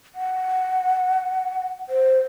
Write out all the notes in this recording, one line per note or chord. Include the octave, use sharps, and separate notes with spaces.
F#5
C5